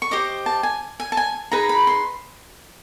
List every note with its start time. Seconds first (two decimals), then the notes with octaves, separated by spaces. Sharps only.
0.02 C#6
0.11 G4 C5 D#5 D6
0.46 A5
0.63 G#5
1.00 G#5
1.12 A5
1.17 G#5
1.52 D#4 G#4 B4 A#5
1.69 B5
1.87 C6